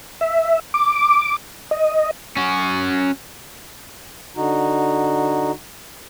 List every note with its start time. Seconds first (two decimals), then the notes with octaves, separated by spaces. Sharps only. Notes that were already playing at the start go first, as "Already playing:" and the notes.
0.21 E5
0.74 D6
1.71 D#5
2.37 C#4 F#4
4.36 D3 D#4 F#4